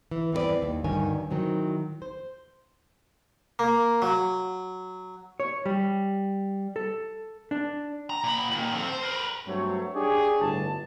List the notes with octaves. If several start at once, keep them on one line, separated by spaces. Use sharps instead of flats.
E3
E2 G2 C4 E4 B4 D5
D#2
D2 G2 D#3 C#5 G#5
A2 D#3 F#3 C4
C5
A#3
F#3
C#5
G3
A4
D4
A#5
A#2 B5
A#2 D#3
C4 A4
C5
A#4 B4
G2 F#3 A3 C4 C#5
D4 G4 G#4 C#5 D5
G1 A2 A5